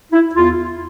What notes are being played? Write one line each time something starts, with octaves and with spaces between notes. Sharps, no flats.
E4
E2 F4